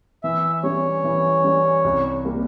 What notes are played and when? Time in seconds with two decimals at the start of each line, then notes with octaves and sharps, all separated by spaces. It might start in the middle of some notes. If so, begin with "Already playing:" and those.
0.24 E3 E5
0.63 G3 C#4 C#5
1.04 E3
1.44 G3 C#4
1.84 C2
2.25 C3 G3 A#3